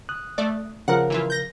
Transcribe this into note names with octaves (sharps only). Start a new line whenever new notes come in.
D#6 F#6
A3 D5
C#3 F3 A#4 F#5
E3 E4 F4
G6 A#6